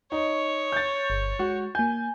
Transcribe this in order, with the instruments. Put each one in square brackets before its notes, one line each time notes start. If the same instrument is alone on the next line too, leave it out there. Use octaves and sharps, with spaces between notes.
[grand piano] D#4 [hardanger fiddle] C#5
[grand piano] G6 A6
[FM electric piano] G1
[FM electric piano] G#3 [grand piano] F#4
[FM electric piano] A#3 G6 [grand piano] G#5